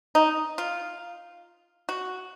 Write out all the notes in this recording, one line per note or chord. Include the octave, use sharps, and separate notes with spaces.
D#4
F4
F#4